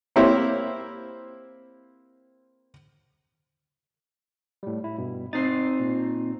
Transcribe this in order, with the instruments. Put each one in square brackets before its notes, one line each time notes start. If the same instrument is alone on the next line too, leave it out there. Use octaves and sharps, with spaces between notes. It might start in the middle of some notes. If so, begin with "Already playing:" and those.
[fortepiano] A#3 C4 E4 G4 C5 C#5
[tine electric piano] A2 G3
E4
G2 B2
[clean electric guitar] C4 D#4 [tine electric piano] A6 C7
[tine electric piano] A#2